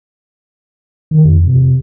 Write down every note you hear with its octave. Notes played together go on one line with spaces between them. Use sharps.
D#3
F2
C3